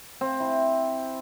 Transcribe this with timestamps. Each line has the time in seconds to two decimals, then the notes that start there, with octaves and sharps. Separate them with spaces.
0.21 C4
0.40 E4